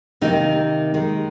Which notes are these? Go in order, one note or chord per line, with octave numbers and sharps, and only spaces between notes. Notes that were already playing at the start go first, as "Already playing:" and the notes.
C3 D#3 A#3 D#4
D#3 G#3